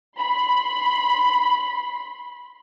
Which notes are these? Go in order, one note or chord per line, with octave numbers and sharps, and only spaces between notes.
B5 C6